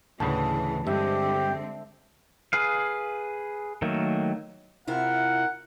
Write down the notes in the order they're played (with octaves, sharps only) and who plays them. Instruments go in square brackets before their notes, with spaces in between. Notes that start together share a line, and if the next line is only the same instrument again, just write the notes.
[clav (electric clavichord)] D2 A2 C#3 [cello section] E3 G#4 [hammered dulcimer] A5
[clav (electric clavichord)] G2 [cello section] D3 G#3 C4 [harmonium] G4 [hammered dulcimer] E5
[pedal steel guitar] G#4 B4 F5
D#3 F#3 A3 A#3
[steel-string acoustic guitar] C3 E4 F4 [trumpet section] A#4 F#5